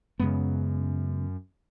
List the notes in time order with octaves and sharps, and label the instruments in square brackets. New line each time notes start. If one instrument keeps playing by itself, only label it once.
[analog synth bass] F#2 [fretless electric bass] C#3 G#3 B3